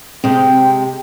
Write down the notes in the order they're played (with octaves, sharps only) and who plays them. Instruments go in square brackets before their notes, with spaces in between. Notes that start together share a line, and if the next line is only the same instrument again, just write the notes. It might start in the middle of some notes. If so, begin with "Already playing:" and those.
[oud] C3 G#3 [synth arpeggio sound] C4 [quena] G5